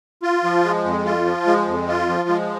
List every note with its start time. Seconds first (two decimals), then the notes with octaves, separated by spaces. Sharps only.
0.23 F4
0.44 F3
0.64 G#3
0.84 F2
1.05 F4
1.26 F3
1.47 G#3
1.67 F2
1.88 F4
2.09 F3
2.29 G#3